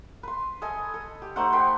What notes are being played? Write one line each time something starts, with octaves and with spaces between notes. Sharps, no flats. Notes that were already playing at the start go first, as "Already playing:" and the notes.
B4 C6
A4 D#5 G#5
A4
G4
A3 D#4 C5 F#5
F#5 G5 B5 C6